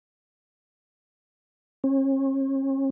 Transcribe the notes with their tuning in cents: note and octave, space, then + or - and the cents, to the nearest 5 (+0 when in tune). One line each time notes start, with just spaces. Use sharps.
C#4 -40